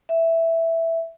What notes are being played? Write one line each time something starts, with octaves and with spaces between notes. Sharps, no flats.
E5